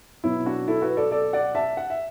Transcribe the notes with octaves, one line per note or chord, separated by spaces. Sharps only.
B2 F#3 B3 E4
D4 F#4
E4 A4
F#4 B4
A4 D5
A4 D5
D5 F#5
E5 A5
F#5
E5